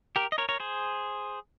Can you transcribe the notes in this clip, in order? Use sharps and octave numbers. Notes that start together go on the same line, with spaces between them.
G4 A#4
D#5
A#4 C#5
A#4 C#5
G#4 C5